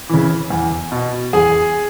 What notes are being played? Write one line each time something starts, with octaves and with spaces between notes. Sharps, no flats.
C#3 E3
E2
B2
E2 G#4 G#5